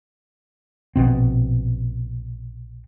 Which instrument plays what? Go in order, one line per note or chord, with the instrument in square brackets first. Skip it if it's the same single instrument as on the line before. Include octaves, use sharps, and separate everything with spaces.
[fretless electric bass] A#1 B2 C4